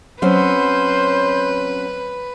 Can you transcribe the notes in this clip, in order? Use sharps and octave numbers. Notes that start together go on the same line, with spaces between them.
F#3 C4 C#4 B4 C5